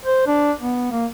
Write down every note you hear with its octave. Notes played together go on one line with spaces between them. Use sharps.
C5
D4
B3
A#3